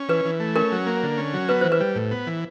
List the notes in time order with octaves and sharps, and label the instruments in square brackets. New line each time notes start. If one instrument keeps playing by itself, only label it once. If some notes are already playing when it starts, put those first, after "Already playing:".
Already playing: [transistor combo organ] C#4
[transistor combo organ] E3 [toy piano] B4
[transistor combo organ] E3
A3
[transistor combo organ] C#4 [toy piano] A#4
[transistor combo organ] F#3
A#3
D3
C#4
F#3
[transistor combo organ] B3 [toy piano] B4
[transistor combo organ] E3 [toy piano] C5
[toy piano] B4
[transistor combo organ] G3
A2
B3
E3